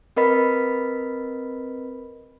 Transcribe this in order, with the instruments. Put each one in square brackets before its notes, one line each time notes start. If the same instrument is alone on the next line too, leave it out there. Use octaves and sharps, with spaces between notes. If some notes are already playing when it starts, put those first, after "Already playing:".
[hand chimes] C4 A#4 B4 D#5 B5 B6